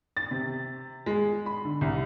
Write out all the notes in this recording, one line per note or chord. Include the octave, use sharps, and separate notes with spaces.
A6
C3
G#3
B5
D3
C2